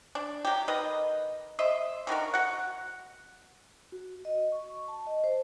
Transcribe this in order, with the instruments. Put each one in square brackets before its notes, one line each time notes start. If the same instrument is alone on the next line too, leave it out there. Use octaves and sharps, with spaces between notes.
[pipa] D4
F#3 G4
D#3 B4 D#5
C5 D#5 E5
D3 D#3 F#4 A#4
F#4 F#5
[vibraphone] F#4
D#5
C#6
A5
D#5
C5